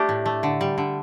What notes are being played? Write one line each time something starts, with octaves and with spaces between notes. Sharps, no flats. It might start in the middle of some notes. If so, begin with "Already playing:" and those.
Already playing: A3 D4 G4
A2
A3
D3
G3
D3